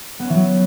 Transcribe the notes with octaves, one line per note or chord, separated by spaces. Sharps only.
B3
C#4
E3
F#3